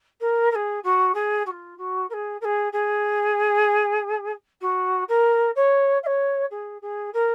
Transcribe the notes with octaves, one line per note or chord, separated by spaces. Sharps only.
A#4
A#4
G#4
F#4
G#4
F#4
F4
F#4
A#4
G#4
A#4
G#4
G#4
F#4
A#4
C#5
F5
C#5
G#4
G#4
A#4